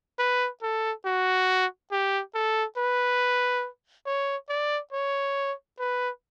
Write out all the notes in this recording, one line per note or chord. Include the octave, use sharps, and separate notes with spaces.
B4
A4
F#4
G4
A4
B4
C#5
D5
C#5
B4